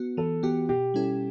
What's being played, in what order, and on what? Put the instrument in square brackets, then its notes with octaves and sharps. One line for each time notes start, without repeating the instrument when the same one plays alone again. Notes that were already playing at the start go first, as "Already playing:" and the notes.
Already playing: [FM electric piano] B3 F#4
[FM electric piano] E3 [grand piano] A4
[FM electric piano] B3 F#4 [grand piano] G4
[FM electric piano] B2 [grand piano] G4
[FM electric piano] G3 C#4 E4 A4